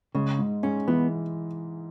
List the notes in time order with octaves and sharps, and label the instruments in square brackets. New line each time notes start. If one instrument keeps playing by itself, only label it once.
[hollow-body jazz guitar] C#3 [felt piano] G#3
[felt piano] G#2
[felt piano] G#2 [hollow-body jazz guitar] C#4
[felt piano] E3 [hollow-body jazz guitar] B3